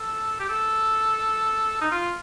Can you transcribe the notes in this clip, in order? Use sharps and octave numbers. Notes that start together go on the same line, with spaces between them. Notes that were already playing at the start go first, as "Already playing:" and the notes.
Already playing: A4
G4
A4
D#4
F4